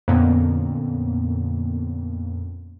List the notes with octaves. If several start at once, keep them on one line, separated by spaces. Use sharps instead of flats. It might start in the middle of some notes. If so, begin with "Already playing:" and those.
F2 A#2 D3 A#3 B3 C#4